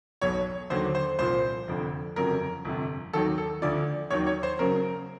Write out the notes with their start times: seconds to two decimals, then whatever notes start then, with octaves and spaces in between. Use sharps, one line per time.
0.21 B1 B2 F#3 C#5
0.70 D#2 D3 F#3 C5
0.95 C5
1.19 C2 A#2 F3 C5
1.67 F1 F2 D3
2.16 G1 F2 C#3 F#3 A#4
2.65 G1 F2 C3
3.13 D#2 D#3 F#3 A4
3.38 A4
3.62 D2 D3 F3 D5
4.10 D#2 D#3 F#3 C#5
4.27 C#5
4.43 C5
4.59 F#1 F#2 C#3 F#3 A#4